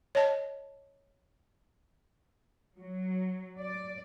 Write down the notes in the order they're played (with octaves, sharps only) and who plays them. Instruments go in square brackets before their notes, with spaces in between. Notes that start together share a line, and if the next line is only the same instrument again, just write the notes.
[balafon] C#5 D#5 A5
[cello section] F#3
D5